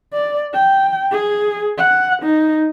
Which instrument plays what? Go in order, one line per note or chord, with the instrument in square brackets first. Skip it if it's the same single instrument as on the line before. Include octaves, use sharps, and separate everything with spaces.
[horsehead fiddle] D5
G5
G#4
F#5
D#4